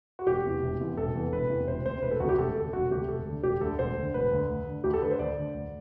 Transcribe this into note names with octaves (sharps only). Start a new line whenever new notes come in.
F#4
E1 G4
E2 C3 E3
E1
E2 C3 E3
E1 A4
E2 C3 E3
E1 B4
E2 C3 E3
E1 C5
D2 C3 C5
E1 B4
A4
D2 C3 F#4 G4
E1 A4
D2 C3 A4
E1 F#4
D2 C3 G4
E1 A4
D2 D3
E1 G4
D2 D3 A4
E1 C5
D2 D3
E1 B4
D2 D3
D2
D3
D2 G4
A4
D3 B4
C5
D2 D5
D3
D2